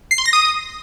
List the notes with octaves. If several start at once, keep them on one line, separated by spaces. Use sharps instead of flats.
C7
C6
A#6
D#6